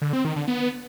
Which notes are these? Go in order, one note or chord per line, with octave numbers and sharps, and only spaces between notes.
D3
C4
D#3
D3
B3